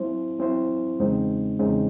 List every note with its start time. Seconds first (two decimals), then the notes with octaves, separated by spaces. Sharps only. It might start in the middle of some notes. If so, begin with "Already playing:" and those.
Already playing: F#3 C4 E4 C5
0.39 F#3 C4 E4 C5
1.00 E2 C#3 G#3 C4 D#4
1.59 E2 C#3 G#3 C4 D#4